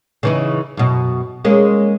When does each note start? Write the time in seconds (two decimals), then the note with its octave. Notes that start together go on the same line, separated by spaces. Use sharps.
0.23 C#3 E3 D#4
0.77 F#2 B2
1.45 G#3 A#3 C#4